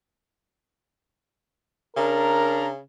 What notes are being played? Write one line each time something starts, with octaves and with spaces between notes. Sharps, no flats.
C#3 D4 A#4 A#5